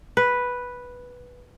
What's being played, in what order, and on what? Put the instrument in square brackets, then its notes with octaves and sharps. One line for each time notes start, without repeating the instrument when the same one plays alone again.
[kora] B4